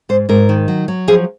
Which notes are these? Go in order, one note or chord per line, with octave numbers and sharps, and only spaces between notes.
G#2 C5
G#2 A#4
D#3
F#3
F#3
F3 G#4